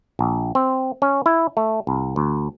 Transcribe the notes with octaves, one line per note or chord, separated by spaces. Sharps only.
A#1
C4
C#4
E4
A3
C2
D2